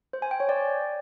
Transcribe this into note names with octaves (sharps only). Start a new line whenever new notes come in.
C5
G#5
G5
C#5
D5